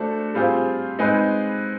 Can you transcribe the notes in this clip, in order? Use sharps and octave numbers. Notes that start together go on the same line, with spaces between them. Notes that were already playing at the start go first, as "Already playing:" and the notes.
Already playing: A3 D4 F#4 A4 C5
G3 C4 F4 G#4 C5
G#3 C4 D#4 G#4 B4